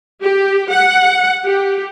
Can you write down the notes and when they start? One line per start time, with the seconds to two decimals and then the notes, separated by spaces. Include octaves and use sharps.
0.21 G4
0.71 F#5
1.45 G4